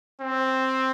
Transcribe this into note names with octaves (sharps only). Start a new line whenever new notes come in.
C4